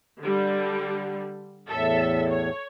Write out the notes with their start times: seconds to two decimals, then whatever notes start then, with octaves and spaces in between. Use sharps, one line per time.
0.22 D3 G3
1.68 E2 A2 A4 E5
2.31 C#5